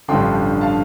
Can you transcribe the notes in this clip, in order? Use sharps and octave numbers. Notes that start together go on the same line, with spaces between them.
A1 G2 D3 F3 G5 C6
F5 A5